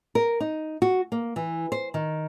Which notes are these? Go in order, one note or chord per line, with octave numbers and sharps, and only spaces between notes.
A#4
D#4
F#4
A#3
E3
C5
D#3